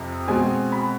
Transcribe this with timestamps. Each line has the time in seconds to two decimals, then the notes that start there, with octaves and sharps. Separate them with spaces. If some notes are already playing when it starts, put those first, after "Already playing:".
Already playing: F2 C3
0.28 B2 G#3 C4 G#5
0.72 B5